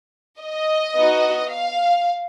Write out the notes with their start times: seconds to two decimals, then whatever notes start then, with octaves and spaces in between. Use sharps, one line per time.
0.40 D#5
0.94 B3 D#4 F#4
1.50 F5